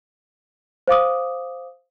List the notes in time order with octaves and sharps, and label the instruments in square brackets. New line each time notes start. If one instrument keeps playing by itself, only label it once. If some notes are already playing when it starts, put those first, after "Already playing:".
[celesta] C5 F5 D6 D#6